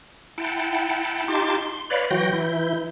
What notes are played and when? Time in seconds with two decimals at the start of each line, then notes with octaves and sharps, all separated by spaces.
0.38 E4 F#5 G5 A5
1.28 D#4 F4 G4 A5 C6 D6
1.58 C6
1.90 B4 C#5 D5 F5 B5
2.11 E3 F#3 F#4 G5 G6 A#6
2.33 E3 E4 G6